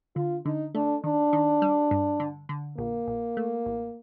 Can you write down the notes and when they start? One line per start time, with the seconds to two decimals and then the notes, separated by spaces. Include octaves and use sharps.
0.16 D3 F4
0.45 D3 D#4
0.75 A3 D4
1.04 D#3 D4
1.33 D#3
1.62 G3
1.91 G2
2.20 D3
2.49 D3
2.78 A#1 A#3
3.07 A#1
3.37 A3
3.66 A1